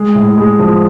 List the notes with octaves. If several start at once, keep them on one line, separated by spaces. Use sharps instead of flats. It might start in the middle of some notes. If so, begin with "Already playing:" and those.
Already playing: G#3
A2
G#3
F3